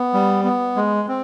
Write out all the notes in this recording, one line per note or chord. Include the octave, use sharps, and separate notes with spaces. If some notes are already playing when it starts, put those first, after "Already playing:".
Already playing: B3
G3
B3
G#3
C4